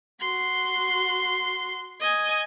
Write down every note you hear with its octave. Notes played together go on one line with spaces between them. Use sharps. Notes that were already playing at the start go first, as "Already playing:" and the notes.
F#4 C6
D#5 G#5